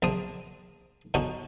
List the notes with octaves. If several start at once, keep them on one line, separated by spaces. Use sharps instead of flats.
A#1 D3 C4 D#6
B2 D3 C#4 D#4 F#4